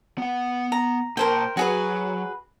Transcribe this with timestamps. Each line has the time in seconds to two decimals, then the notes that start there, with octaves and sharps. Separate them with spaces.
0.18 B3 F#5
0.72 A#5
1.17 A#2 A#4 C5 G5 A5
1.57 F#3 F#4 G#4 B4